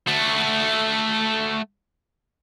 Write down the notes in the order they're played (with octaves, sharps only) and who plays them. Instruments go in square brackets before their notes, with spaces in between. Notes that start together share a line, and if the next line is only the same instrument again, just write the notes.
[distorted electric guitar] A3 F#4